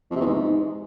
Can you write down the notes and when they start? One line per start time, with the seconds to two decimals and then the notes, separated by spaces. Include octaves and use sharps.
0.11 F2
0.16 C3
0.21 E2
0.26 G#2